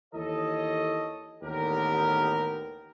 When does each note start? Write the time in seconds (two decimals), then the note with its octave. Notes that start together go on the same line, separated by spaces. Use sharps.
0.14 D#2 E3 A4 C#5 D#5
1.43 A1 D#2 D3 B3 G4 A#4